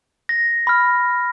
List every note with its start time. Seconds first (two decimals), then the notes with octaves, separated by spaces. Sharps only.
0.29 A#6
0.67 B5 F6